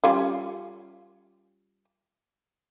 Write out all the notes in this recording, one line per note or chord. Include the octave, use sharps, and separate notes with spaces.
G3 C#4 F4